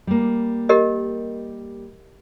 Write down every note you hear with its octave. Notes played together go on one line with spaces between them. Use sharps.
G3 A#3
G4 A#4 D#5